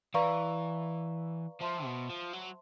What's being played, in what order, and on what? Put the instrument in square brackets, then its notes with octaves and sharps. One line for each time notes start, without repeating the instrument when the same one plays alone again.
[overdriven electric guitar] E3 [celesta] B4 D5 F5 A#5 C#6
[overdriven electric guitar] F3 [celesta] C5 E5 A5 C6
[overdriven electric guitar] B2
F3
F#3